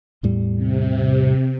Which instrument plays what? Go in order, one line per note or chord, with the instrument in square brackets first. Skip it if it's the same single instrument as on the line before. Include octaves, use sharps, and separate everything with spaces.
[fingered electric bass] E2 A2 G3
[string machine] C3